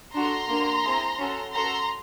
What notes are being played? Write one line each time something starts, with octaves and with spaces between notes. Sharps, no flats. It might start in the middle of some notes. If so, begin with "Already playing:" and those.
D4 F#4 A4 A#5 C6
A#3 D4 F#4
C4 E4 G#4
C#4 F#4 A4
C#4 F#4 A4 A#5 C6